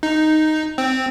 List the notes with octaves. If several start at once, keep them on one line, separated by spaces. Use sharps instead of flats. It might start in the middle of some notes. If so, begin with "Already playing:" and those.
D#4
C4